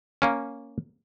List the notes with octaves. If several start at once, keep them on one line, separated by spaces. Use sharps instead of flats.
A#3 C#4